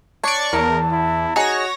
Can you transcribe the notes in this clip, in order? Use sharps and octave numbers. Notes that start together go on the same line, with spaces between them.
D4 C#5 D5 C#6 C#7
E2 A#4 A5
E4
D#4 F#4 G#4 C#5 A#6